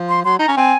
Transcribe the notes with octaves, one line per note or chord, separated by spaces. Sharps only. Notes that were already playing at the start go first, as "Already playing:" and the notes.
Already playing: F3
C6
F#3 C6
D#4 A#5
C#4
C4 G#5